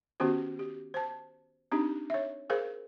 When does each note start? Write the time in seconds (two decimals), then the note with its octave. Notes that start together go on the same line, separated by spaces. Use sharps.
0.20 D#3 B3 C#4 F#4 G4 C5
0.59 G4
0.94 C5 A5
1.72 C4 D4 D#4 G4
2.10 C#5 E5
2.50 G#4 A#4 C5 F5